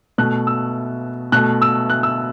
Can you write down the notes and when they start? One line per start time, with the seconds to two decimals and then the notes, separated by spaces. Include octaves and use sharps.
0.18 B2 A3 F#6
0.47 E6
1.32 B2 A3 F#6
1.62 E6
1.90 F#6
2.03 E6